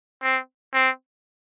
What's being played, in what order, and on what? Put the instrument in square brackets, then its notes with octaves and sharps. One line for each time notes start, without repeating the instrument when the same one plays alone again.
[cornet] C4
C4